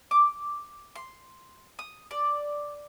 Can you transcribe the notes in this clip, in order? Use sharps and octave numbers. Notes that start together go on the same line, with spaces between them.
D6
C6
D#6
D5